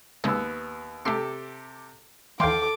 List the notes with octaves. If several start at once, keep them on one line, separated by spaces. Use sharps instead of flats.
D#2 C#3 G#3 B3 G#4 E6
C3 A3 G4 A4 C6
D#2 E3 A4 F5 G5 C6 D6